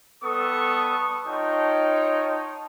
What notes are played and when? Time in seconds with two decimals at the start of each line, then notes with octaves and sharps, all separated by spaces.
0.23 G3 B3 A4 C#6 D#6
1.26 D#4 F4 C#5 G5 A5 C#6